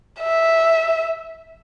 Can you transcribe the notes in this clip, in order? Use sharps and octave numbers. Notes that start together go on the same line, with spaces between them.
E5